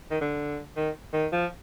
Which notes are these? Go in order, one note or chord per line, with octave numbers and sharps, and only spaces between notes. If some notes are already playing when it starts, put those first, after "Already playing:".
D#3
D3
D#3
D#3
F3